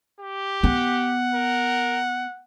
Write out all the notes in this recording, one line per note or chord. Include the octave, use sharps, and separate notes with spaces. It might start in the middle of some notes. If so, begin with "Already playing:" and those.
G4
B3 F#5
A#4